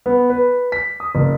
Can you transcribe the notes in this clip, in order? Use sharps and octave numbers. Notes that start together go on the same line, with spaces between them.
B3
B4
B6
D#6
F#1